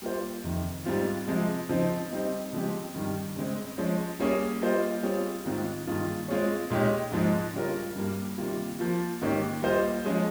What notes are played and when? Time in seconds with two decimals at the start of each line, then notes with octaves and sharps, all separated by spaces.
0.02 G3 A#3 F4 C5
0.44 F2 C3 D#3
0.85 G#2 G3 C4 F4
1.27 C3 F3 G#3
1.69 C#3 F3 C4 D#4
2.11 G3 C4 D#4
2.53 C#3 F3 G#3 C4 G4
2.95 G2 D#3 G3
3.36 C#3 G#3 C4
3.78 F3 G#3 C#4
4.19 G3 A#3 C#4 G#4 C#5
4.62 G3 A#3 F4 C5 D#5
5.03 G3 C4 F4 G#4 C#5
5.45 G#2 D#3 G#3 C4 F4
5.87 G2 D#3 A#3 F4 G#4
6.28 G#3 C4 F4 G#4 C#5
6.70 A#2 G#3 D#4 G4 C#5
7.12 G#2 F3 G#3
7.53 C#3 G3 C#4 F4 A#4
7.96 G2 G3 A#3
8.37 C3 D#3 G3 A#3 F4
8.79 F3 A#3 F4
9.21 G#2 D#3 A#3 C#4 G4
9.62 G3 A#3 F4 C5 D#5
10.05 F3 G#3 C#4 G#4